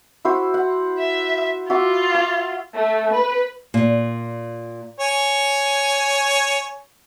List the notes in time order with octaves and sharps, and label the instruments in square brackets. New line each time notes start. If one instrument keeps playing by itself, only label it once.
[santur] E4 F#4 C5
F#5
[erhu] E5
[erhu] F4 [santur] F#4 E5 D6
[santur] C#6
[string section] A3
B4
[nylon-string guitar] A#2
[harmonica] C#5 G#5